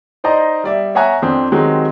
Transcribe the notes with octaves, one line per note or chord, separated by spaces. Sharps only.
D#4 C5 D5 D#5 A#5
G3 D5 E5
C#5 E5 F#5 G#5 A#5 F#6
F2 C4 D4
D#3 F#3 G#3 C4 G4